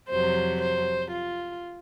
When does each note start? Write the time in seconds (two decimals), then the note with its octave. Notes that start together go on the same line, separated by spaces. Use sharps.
0.10 F2 C3 F#3 C5
0.61 C5
1.11 F4